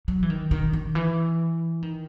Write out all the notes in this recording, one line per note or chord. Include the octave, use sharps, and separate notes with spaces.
F#3
E3
D#3
D#3
D#3
E3
D#3